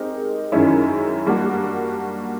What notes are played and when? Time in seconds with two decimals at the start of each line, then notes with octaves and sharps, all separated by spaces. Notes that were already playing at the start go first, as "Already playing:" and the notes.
Already playing: G#3 C4 D#4 G4 A#4
0.52 F#2 D#3 G#3 C#4 E4
1.27 G3 A#3 D4 F#4